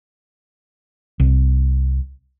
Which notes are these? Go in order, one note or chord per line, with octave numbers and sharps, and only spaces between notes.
C2